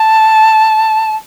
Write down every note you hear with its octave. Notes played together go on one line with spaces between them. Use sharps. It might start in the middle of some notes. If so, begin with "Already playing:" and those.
Already playing: A5